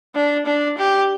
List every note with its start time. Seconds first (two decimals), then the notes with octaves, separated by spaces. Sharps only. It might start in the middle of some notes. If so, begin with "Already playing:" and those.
0.15 D4
0.46 D4
0.78 G4